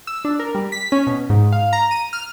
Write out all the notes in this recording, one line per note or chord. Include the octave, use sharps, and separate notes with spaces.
E6
D4
A#4
G3
B6
C#4
B2
G#2
F5
A#5
D#7
F6